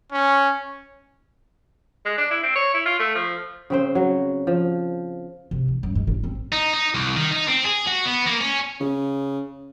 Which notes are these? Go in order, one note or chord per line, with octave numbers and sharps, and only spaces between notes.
C#4
G#3
D4
E4
C4
C#5
E4
F4
A3
F3
C#3 C4 C5
F#3
F3
C3
E3
F#2
G#2
A1
C4
D#4
D#4
C2
D#3
D#4
C4
G#4
F#4
B3
A#3
C#4
C#3